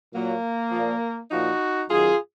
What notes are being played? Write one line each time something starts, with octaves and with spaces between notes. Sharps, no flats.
A#2 F#3 A#3
A#2 F3
A#2 F3 D#4 F#4
F#2 D#3 F#3 F4 G#4